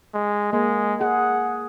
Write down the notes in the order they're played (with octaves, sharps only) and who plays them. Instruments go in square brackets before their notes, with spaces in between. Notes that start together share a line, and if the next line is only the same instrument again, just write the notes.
[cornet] G#3
[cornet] G#3 [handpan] A#3
[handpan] G#4 [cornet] F#5